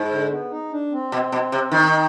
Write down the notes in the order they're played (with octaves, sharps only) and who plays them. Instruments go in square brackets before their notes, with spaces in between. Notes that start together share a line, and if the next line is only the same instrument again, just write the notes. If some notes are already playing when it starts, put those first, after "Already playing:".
Already playing: [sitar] G#2
[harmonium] D3
B3
D#4
D4
C4
[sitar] B2
B2
C3
[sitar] D#3 [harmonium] D#4